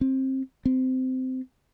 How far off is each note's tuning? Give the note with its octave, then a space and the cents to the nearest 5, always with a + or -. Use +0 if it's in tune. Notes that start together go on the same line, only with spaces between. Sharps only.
C4 +20
C4 -20